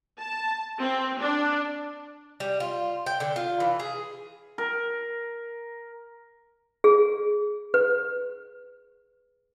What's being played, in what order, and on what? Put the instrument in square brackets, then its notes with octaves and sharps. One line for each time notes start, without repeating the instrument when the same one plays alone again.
[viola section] A5
C4
D4
[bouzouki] G3
F4
G5
D3
F4
E3
G#4
[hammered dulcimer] A#4
[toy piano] G#4
B4